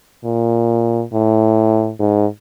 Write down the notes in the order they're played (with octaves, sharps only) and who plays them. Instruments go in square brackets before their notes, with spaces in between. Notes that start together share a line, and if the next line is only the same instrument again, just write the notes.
[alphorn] A#2
A2
G#2